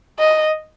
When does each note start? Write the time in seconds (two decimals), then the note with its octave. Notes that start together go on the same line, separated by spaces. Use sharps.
0.19 D#5